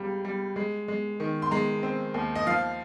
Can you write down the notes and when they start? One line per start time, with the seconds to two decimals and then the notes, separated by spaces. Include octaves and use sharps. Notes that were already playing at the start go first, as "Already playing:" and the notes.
Already playing: C#2 G3
0.25 G3
0.56 G#3
0.88 G#3
1.20 D#3
1.42 C6
1.51 G#3 A#5
1.83 C4
2.14 D#2
2.35 D#5
2.46 F3 F5